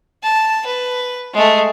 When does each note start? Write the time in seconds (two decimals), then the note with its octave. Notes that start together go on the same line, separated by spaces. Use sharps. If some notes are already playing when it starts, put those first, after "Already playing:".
0.23 A5
0.66 B4
1.34 G#3 A3